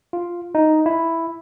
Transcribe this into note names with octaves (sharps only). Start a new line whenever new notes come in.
F4
D#4
E4